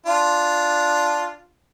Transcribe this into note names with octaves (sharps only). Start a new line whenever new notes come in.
D4 F4